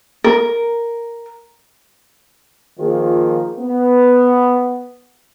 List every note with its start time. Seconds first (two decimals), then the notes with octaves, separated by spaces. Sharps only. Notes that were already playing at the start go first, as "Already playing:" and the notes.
0.24 A#4
2.79 D#3 F3 A#3 F4 G#4
3.58 B3